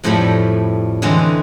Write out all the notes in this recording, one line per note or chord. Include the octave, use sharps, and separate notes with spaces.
F2 A2 F3 G3 A3 B5
D3 E3 G#3 C4 C#4